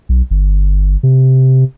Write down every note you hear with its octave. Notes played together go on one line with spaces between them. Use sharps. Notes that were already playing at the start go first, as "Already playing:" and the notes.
B1
G1
C3